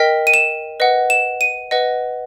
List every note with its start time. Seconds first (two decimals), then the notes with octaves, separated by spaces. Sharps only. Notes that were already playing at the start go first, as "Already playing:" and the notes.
Already playing: A#4 D#5 G5 B6
0.27 D#7
0.34 E7
0.80 B4 D#5 F#5
1.10 E7
1.41 D#7
1.71 B4 D#5 F#5